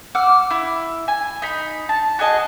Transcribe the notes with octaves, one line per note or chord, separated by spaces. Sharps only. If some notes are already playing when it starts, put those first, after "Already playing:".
F#5 D6 E6 F6
E4
G#5
D#4 B5
A5
F#4 G#4 D#5 A5